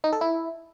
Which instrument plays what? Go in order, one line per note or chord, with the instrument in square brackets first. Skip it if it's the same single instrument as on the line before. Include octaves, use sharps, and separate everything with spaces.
[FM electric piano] D#4
A4
E4